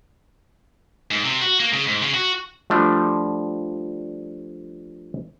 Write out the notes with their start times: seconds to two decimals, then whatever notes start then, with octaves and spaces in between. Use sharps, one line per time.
1.11 G#2
1.24 C3
1.41 F#4
1.60 A#3
1.73 C#3
1.86 G#2
2.02 C#3
2.14 F#4
2.70 F3 G3 A3 D4